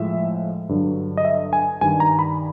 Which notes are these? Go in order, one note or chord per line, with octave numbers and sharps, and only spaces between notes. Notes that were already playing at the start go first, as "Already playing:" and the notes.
Already playing: A2 F3 G#3 E5
G2 D3 F#3
D#5
E5
G#5
G2 D#3 G3 G#5
A#5
B5